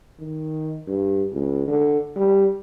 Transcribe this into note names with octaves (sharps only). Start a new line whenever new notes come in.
D#3
G2
C#2
D3
G3